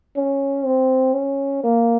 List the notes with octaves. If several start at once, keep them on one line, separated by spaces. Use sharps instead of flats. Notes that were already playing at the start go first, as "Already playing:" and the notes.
C#4
C4
C#4
A#3